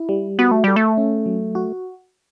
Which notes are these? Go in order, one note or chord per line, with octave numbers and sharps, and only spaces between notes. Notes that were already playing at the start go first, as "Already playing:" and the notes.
Already playing: E4
G3
B3 F#4
A3
G3 A4
A3
C#4
F#3
F#4